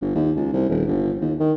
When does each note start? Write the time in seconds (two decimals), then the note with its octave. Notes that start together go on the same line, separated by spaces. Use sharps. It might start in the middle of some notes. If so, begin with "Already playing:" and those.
0.02 G1
0.15 D#2
0.36 C#2
0.53 C2
0.69 D#1
0.87 G1
1.21 D#2
1.40 D#3